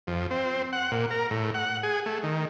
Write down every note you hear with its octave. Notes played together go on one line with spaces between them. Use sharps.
F2
C4
F#5
A#2
A#4
A2
F#5
G#4
A3
D#3